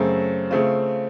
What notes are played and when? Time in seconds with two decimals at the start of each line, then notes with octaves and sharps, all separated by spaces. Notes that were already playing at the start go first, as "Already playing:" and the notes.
Already playing: F#2 C#3 A3 C4
0.50 C#3 A3 C4 F4